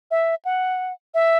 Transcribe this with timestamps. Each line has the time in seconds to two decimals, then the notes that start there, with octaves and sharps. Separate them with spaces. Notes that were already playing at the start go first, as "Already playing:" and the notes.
0.11 E5
0.45 F#5
1.14 E5